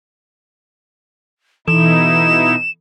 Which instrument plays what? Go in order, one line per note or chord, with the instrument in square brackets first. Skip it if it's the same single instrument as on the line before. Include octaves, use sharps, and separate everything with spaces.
[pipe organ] B2 D#4 E4 [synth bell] E3 A4 [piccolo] E7